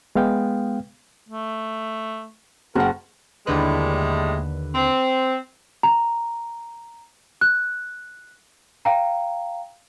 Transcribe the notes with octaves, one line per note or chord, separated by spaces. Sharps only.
G#3 B3 F5 G5
A3
F#1 F#4 A#4 F#5
D#2 A2 D3 G3 G#3 B4
C4
A#5
F#6
F5 G5 A#5